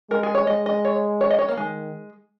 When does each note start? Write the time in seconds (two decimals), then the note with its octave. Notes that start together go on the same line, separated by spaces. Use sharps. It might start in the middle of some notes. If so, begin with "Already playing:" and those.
0.10 G#3 A#4
0.23 G#4
0.35 C#5
0.47 G#3 D#5
0.66 D#5
0.85 C#5
1.21 C#5
1.30 D#5
1.39 C#5
1.48 A#3
1.57 D#3 G#3